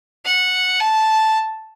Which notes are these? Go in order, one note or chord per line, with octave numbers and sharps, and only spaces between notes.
F#5
A5